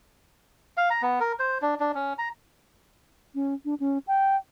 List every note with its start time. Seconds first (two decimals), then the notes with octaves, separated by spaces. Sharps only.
0.77 F5
0.90 A#5
1.02 B3
1.20 A#4
1.39 C5
1.62 D4
1.80 D4
1.95 C#4
2.18 A#5
3.35 C#4
3.65 D4
3.80 C#4
4.07 G5